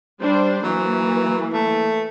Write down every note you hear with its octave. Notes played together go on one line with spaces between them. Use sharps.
G3 D4 C5
E3 F#3 A#3
A3